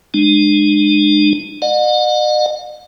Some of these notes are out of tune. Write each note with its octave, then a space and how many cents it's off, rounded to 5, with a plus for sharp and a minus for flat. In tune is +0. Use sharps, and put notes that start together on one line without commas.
G#3 +0 D4 +40
D#5 -45 F#5 -40